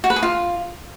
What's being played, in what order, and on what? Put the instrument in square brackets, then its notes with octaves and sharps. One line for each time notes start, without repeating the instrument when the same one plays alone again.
[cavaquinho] F#4
B4
G#4
F4